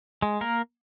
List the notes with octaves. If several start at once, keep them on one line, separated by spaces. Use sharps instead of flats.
G#3
A#3 A#4